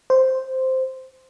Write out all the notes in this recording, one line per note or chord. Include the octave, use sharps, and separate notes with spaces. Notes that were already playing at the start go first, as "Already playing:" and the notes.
C5